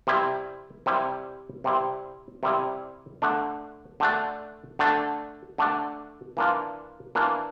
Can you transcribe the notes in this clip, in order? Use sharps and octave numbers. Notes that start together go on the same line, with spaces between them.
C3 G3 C4 E4
C3 G3 C4 E4
C3 G3 C4 E4
C3 G3 C4 E4
D3 A3 D4
D3 A3 D4
D3 A3 D4
D3 A3 D4
E3 A#3 D4 F4
E3 A#3 D4 F4